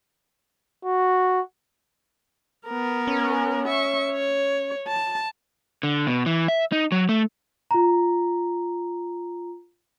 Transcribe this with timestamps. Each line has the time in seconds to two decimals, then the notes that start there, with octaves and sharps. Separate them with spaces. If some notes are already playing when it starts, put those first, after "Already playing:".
0.85 F#4
2.66 B3 A#4
3.07 C#4
3.68 E5 C#6
4.12 C#5
4.87 A5
5.83 D3
6.07 B2
6.26 E3
6.48 E5
6.72 D#4
6.92 F#3
7.09 A3
7.71 F4 A#5